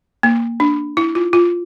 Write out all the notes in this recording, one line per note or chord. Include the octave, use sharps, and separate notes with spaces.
A#3
D4
E4
F4
F4